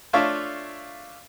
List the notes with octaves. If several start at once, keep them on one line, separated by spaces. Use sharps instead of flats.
A3 D4 F4 C#5 E5 F5